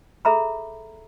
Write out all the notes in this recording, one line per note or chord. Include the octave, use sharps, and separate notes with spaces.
G#4 A4 E5 A#5 B5